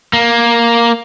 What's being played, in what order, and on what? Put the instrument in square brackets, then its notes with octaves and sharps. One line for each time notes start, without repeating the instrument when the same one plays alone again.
[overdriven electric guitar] A#3